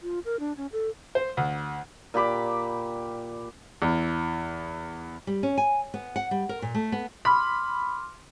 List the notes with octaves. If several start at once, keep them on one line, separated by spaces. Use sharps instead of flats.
F4
A#4
D4
C#4
A4
C5
D2
A#2 G4 B5 D6
E2
G3
C#4
G#5
B3
F#5
G3
A#4
A#2
A3
B3
B5 C6 D6 F6